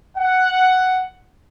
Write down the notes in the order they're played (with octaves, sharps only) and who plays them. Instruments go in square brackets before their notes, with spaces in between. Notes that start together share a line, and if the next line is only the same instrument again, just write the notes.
[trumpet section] F#5